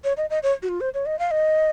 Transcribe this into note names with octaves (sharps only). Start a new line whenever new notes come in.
C#5
D#5
D#5
C#5
F#4
F4
C5
C#5
D#5
F5
D#5